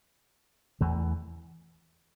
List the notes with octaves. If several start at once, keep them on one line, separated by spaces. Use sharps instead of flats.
E2 E3 A3